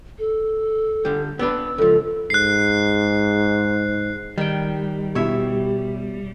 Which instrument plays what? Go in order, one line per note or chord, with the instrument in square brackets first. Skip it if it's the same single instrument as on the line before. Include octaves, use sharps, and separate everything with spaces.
[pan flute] A4
[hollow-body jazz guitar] D3 G3
[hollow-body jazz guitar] B3 D4 B4 [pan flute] E6
[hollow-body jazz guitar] C#2 F3 [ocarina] A4
[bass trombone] G#2 [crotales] F#6 C7
[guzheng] D#3 G5 [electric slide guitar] G3
[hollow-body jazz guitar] B2 E4 [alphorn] G4 [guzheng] C#5 E5